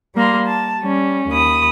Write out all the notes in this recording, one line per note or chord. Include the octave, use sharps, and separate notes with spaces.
G3 A#3 A#5 C6
A5
G3 C#4
D#2 B5 D#6